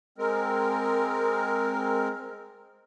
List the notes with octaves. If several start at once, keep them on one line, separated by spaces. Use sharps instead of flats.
G#3 C4 A#4